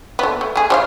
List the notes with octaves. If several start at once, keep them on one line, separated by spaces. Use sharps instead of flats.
A3 B3
A3
A3 G#4
G3 C#5 F5